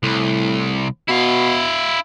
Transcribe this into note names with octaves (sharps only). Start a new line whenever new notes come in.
C2 A2
B2 E4 F5